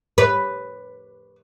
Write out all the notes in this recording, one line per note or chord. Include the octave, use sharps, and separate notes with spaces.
B4